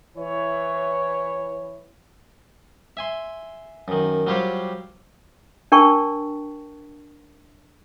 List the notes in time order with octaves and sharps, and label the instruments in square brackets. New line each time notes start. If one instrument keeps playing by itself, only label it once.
[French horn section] E3 C#5
[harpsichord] E5 G#5 C6
F#2 D#3
F#3 G3 F4 G4 C5 C#5
[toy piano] D4 A#4 G5 A5 C#6